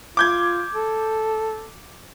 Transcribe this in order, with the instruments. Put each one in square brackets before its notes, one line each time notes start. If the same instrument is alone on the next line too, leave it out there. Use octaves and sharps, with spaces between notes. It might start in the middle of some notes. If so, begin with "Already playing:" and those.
[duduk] F4 [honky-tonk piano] D6 G6 G#6
[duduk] A4